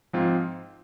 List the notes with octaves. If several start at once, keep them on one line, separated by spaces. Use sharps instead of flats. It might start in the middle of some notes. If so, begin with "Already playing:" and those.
G#2 F3 C4 F4